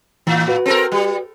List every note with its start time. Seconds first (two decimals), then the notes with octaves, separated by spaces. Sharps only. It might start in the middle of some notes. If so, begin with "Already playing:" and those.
0.27 A2 E3
0.48 F#4 B4
0.66 C4 A4 A#4
0.92 G3